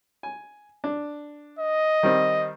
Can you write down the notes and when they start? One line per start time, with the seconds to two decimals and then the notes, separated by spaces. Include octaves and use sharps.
0.23 G#5
0.84 D4
1.59 D#5
2.03 D#3 G3 C4